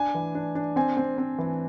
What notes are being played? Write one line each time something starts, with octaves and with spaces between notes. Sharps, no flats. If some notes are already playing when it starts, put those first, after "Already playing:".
Already playing: D4 G#5
E3
D4
D4
C4 G#5
C4
C4
E3